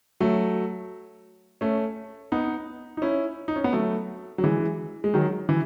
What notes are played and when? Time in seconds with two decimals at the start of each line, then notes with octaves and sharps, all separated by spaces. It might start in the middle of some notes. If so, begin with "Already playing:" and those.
0.20 F#3 A3
1.61 A3 C#4
2.32 B3 D#4
2.97 D#4
3.02 C#4 E4
3.48 D#4
3.56 C#4
3.64 B3
3.73 F#3 A3
4.38 F#3
4.44 E3 G#3
5.04 G#3
5.14 D#3 F#3
5.49 E3